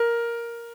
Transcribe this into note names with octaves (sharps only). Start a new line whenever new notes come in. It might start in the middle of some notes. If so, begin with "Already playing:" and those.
Already playing: A#4